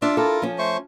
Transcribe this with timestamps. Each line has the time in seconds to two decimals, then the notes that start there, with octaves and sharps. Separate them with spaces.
0.02 D4 F4 E5 F5
0.17 E4 F4 A4 A#4
0.42 F3 C#4
0.58 A3 C5 C#6